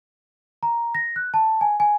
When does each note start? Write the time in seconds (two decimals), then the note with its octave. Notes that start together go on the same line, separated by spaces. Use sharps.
0.63 A#5
0.95 A#6
1.16 F#6
1.34 A5
1.61 G#5
1.80 G#5